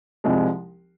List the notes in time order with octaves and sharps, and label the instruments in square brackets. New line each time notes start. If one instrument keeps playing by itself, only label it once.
[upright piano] C2 C3 F3 G#3